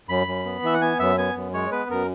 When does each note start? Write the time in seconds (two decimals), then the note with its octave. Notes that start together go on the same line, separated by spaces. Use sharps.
0.09 F#2 B5
0.27 F#2
0.45 B3
0.63 E3 E5
0.74 F#5
0.81 B3 G#5
0.99 F#2 E5
1.18 B3 G#5
1.35 F#2
1.54 G#3 C#5
1.72 B3 B4
1.90 F#2 A#4